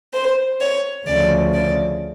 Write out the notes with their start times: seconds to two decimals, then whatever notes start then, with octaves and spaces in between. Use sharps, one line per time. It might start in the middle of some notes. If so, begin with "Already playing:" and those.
0.13 C5
0.60 C#5
1.07 D2 C#3 F3 D5
1.54 D5